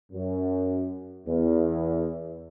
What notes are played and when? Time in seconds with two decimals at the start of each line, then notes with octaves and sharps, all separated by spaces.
0.12 F#2
1.27 E2